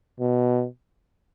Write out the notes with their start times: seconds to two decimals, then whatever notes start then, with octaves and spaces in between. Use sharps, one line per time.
0.20 B2